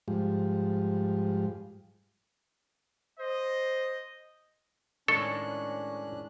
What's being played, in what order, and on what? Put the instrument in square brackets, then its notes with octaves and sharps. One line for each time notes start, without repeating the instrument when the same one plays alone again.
[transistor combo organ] G#2 F3 G3
[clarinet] C5 [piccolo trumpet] D#5
[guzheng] A2 D#3 G#3 [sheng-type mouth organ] C#4 D4 F#6 [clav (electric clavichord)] A4 [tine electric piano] C#6